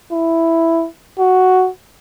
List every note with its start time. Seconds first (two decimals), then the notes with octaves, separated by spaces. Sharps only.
0.13 E4
1.19 F#4